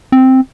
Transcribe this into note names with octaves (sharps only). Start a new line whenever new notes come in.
C4